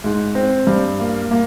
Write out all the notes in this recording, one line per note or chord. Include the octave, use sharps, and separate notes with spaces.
G#2
C4
G2
A#3
A#3